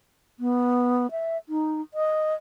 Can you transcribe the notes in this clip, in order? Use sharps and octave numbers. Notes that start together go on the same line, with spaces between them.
B3
E5
D#4
D#5